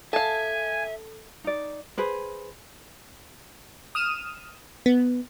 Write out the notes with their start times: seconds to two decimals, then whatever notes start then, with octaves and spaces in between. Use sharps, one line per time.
0.13 A4 E5 F5 G#5 A5
1.44 D#4 D5
1.98 G#4 B4 C5
3.95 D#6 F6 D#7 E7
4.86 B3